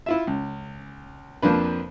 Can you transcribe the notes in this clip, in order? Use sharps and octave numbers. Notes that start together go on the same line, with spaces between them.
E4 F4 E5
C#2
F2 F3 A#3 D4 B4